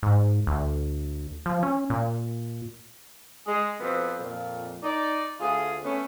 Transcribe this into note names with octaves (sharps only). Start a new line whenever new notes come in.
G#2
D2
F3
C#4
A#2
G#3 G#4
F2 B2 B3 C5
F2 A#2
D#4 D5
D2 F4 G#4
A3 B3 C#4